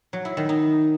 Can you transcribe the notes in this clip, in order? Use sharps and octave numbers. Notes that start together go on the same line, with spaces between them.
F#3
E4
D#3
D#4